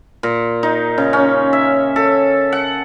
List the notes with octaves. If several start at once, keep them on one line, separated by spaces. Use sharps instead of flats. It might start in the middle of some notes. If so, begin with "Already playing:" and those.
A#2
D#4
C#3
C#4
E5
A4
F#5